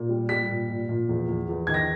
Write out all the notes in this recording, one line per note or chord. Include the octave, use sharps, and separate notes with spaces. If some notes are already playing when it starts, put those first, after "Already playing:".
Already playing: A#2
G3
G3 B6
A#2
A#2
A#2
E2
E2
E2
D#3 G#6
A#6